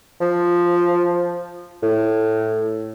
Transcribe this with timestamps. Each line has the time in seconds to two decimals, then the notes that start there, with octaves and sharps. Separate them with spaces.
0.21 F3
1.82 A2